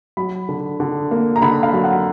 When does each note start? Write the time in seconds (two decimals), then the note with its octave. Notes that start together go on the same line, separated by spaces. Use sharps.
0.17 F#3 B5
0.49 D3
0.80 D3
1.11 A#3
1.36 A#5
1.42 D3 B5
1.63 F5
1.73 F#3
1.84 F#5